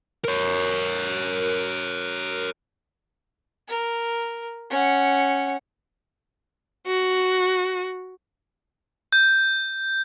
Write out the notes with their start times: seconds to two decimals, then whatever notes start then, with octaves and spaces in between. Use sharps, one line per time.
0.24 A#4 C#5
3.68 A#4
4.70 C#4 F#5
6.87 F#4
9.12 G6